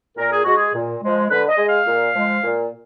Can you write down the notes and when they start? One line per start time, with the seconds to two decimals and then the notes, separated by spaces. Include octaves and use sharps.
0.17 A#2 A#4
0.31 G#4
0.44 G#3 F#4
0.56 G#4
0.75 A#2
1.02 F3 G#3
1.30 D3 B4
1.49 D#5
1.58 G#3
1.69 F5
1.87 A#2
2.16 F3 G#3
2.44 A#2